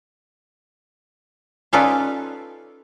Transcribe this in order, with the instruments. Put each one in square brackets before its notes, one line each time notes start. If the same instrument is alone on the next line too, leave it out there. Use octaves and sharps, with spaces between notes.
[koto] C#4 D#4 F4 A4 B4 D5